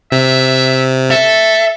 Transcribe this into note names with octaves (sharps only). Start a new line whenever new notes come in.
C3 E5
A4 E5